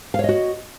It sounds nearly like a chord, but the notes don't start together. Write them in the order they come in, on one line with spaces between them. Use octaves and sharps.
F5 C#5 D#5 F#4